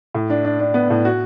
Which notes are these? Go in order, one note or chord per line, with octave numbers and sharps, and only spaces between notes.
A2
D4
D4
D4
B3
A2
F#4